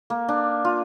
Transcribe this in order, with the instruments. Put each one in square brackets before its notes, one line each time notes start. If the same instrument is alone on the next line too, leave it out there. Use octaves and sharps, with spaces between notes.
[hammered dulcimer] A#3
D4
F4